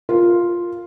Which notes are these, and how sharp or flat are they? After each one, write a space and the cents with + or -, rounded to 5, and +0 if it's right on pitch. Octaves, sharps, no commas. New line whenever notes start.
F4 +0 A#4 +0